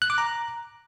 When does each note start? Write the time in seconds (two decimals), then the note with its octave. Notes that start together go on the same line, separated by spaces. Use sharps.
0.02 F#6
0.10 D6
0.18 A#5